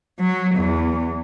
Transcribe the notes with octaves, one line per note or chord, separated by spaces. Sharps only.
F#3
E2